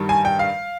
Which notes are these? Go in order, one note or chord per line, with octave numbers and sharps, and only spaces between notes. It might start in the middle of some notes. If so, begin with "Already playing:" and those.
Already playing: G2 D#3 G3
G#5
G5
F5